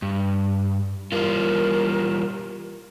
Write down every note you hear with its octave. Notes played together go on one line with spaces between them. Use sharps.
G2
E3 G3 F4 A#4